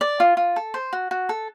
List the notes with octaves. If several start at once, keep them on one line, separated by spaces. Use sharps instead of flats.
D5
F4
F4
A4
C5
F#4
F#4
A4